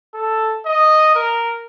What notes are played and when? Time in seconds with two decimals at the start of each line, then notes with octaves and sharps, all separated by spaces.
0.14 A4
0.66 D#5
1.15 A#4